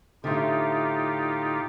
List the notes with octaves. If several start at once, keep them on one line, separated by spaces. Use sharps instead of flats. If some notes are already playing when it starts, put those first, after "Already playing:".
A2 D3 D#4 F4 G4